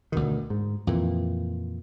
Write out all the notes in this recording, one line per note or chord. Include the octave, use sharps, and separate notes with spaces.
D2 B2 D#3
G#2
F2 A#2 E3